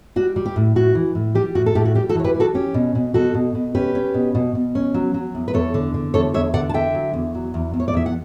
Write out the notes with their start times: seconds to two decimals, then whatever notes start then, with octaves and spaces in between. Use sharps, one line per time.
0.16 G3 F#4
0.36 G3
0.46 G4
0.56 A2
0.76 A2 F#4
0.95 E3
1.15 A2
1.35 G3 G4
1.55 A2 F#4
1.66 A4
1.75 A2 G4
1.85 F#4
1.95 G3 G4
2.09 F#4 A4
2.15 E3 C#5
2.24 G4 B4
2.34 G3
2.40 F#4 A4
2.55 C#4 G4
2.74 B2
2.95 B2
3.14 B2 F#4 A4
3.34 B2
3.55 B2
3.75 C#4 G4 B4
3.95 C#4
4.14 B2
4.35 B2
4.55 B2
4.75 C#4
4.94 F#3
5.14 F#3
5.35 E2
5.48 B4
5.54 E2 A4 C#5
5.74 D3
5.94 D3
6.14 E2 A4 C#5
6.34 E2 C#5 E5
6.54 D3 D5 F#5
6.69 A5
6.74 D3 E5 G5
6.94 F#3
7.14 E2
7.35 F#3
7.54 E2
7.74 E2
7.80 C#5
7.88 D5
7.94 E2 E5
8.06 F#5